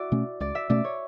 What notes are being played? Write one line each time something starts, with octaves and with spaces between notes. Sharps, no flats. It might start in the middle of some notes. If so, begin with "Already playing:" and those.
Already playing: E4 F#4 D5 E5
B2 A3 C#4
C#2 D5
E5
B2 A3 C#4 D5
C#5